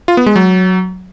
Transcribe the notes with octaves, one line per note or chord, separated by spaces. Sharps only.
F4
B3
G#3
F#3